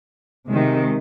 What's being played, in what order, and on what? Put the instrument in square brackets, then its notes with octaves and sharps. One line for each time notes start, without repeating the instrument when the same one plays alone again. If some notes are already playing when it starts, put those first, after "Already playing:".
[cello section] C3 D#3 G#3